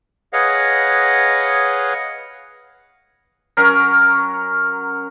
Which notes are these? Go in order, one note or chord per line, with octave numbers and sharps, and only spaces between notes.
G#4 B4 C#5 D#5 F5 F#5
F#3 C#4 A#4